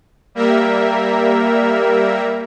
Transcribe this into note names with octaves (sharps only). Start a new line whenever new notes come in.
G3 A#3 A#4 E5